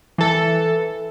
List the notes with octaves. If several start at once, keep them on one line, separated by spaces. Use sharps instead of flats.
E3 A4